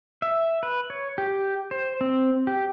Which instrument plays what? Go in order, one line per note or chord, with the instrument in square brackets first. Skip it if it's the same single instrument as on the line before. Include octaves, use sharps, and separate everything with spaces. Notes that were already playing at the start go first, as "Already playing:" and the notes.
[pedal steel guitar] E5
B4
C#5
G4
C5
C4
G4